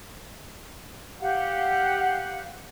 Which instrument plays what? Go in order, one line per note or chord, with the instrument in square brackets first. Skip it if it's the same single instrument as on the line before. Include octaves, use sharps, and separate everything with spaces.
[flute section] G4 F5 F#5